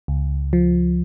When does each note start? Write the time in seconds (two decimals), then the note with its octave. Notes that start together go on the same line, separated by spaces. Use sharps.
0.08 C#2
0.53 F3